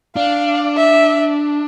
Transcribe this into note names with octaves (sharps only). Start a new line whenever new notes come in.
D4 F5
E5